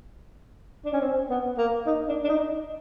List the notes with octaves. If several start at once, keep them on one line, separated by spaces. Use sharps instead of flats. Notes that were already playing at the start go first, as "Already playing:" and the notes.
D4
C#4
C4
B3
A#3
D#4
D4
D4
D#4